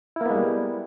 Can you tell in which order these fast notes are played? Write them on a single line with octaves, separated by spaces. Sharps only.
E4 A#3 B3 G#3 G3